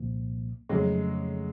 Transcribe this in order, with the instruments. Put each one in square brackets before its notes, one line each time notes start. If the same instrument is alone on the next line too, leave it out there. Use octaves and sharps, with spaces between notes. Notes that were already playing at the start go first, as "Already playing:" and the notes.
Already playing: [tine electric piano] C2 A#2 F3 A#3
[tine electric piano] F2 C#3 F3 A3 C#4 [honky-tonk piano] F#3 G#3